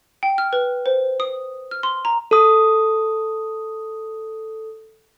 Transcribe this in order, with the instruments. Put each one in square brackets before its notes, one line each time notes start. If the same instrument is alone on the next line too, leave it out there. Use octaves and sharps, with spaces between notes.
[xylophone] G5
F6
B4
C5
D#6
F6
C6
A#5
[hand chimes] A4 D#6